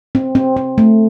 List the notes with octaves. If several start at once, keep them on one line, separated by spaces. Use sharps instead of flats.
C4
C4
C4
A3